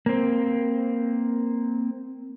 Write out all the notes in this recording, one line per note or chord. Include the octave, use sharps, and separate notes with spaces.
A#3 C4